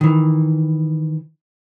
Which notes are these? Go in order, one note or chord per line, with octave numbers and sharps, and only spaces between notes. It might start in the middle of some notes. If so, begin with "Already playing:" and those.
D#3 E3